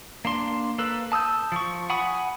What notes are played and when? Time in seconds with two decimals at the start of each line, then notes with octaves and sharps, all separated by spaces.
0.25 A#3 D4 C6
0.78 A#3 A4 B4
1.12 A5 D#6 E6 G6
1.52 F3 C#6
1.90 F#5 G#5 B5 C#6 D#6